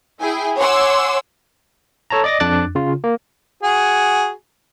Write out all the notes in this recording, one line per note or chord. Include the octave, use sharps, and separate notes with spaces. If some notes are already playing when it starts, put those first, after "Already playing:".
E4 G#4 G5 G#5
C#5 F#5 G#5 C6 D6 E6
A4 C#5 A5 A#5
D5 D#5 D6 A6 A#6
F2 D4 D6 F#6 A6
C#3 F4
A#3
F#4 G#4